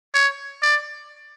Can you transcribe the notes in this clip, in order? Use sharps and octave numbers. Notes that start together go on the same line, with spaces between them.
C#5
D5